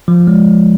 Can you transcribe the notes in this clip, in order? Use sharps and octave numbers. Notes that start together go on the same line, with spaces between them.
F3
G#3